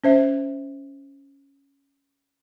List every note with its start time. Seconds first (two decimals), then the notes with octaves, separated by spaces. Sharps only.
0.04 C#4 C5 E5